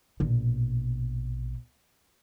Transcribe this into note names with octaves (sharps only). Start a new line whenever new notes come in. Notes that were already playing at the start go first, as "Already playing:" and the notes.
A#1 B2